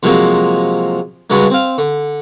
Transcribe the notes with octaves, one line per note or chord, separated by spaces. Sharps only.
C3 F3 F#3 G#3 A#3 C4
G2 C#3 F#3 G#3 D4
C4 F5
D3